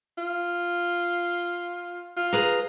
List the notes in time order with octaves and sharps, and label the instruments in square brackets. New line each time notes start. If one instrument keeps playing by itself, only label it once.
[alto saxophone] F4
F4
[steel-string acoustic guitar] G#4 B4 A#5